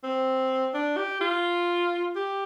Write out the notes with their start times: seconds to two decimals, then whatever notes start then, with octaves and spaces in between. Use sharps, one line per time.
0.03 C4
0.74 D4
0.97 G4
1.21 F4
2.16 G4